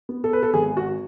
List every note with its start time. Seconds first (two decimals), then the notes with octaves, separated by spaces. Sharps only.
0.09 B3
0.24 A4
0.33 B4
0.43 A4
0.54 G#1 G#4
0.77 F#4